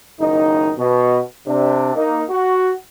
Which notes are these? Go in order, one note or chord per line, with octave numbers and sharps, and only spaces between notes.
F#1 D#3 D#4
B2
C3 D4
A#3 D#4
F#4